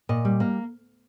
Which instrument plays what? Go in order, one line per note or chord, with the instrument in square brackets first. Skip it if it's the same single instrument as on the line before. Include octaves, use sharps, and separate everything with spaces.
[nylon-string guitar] A#2 D#5
G3
A#3